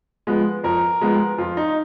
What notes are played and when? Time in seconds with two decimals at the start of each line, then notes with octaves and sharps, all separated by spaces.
0.27 F3 G#3 B3
0.64 F2 A#4
1.01 F3 G#3 B3
1.38 F2 F4
1.57 D#4